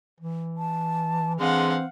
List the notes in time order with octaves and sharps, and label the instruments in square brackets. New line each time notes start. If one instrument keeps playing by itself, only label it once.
[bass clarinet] E3
[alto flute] A5
[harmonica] D3 G#3 C6 [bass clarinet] E3 [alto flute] C4 [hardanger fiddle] F5 F#5